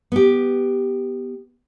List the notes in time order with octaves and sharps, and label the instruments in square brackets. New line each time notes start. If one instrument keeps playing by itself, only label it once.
[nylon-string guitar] B3 G4